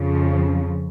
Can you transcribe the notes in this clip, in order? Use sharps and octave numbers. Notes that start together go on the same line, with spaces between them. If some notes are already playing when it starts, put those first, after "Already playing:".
Already playing: F2 C#3 F3